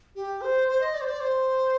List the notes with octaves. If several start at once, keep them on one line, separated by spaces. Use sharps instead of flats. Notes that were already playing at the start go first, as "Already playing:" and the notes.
G4
C5
C5
D#5
D5
C5
D5
C5